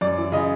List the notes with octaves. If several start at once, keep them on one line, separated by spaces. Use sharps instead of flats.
F#2 D5
E3
C#3 D#5